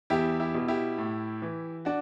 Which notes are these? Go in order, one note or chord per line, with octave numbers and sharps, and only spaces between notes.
E2 E4 G4
E4 G4
B2
E4 G4
A2
E3
D4 F#4